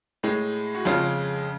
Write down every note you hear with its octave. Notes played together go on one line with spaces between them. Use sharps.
A2 G#3
F#4
F2 C#3 G#3 F4